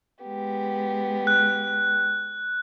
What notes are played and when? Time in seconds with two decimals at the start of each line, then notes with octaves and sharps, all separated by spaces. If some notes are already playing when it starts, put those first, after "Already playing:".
0.24 G#3 B3 G4
1.27 F#6